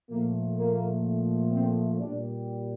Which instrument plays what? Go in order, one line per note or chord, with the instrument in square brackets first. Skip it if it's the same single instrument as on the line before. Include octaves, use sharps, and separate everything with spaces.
[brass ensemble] A#2 F3 A3 A#3
A#3
C4
A#2 G3 D4